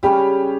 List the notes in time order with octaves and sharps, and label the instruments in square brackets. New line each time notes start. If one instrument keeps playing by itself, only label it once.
[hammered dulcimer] C#3 G3 C#4 [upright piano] G4